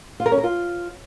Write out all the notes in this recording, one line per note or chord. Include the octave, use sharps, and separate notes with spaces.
F4
A#4
C#4
A#4
F4